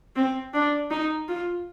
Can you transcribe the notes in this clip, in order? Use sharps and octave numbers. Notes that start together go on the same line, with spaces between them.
C4
D4
D#4
F4